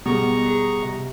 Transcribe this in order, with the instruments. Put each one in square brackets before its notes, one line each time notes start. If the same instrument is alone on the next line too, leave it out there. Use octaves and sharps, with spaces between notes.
[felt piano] B2 G#3 [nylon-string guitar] G3 [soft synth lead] B3 [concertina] A#5 C#6
[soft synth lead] G#4
C3